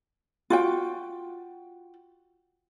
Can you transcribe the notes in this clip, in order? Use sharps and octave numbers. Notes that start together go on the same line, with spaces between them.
F4 F#4 G5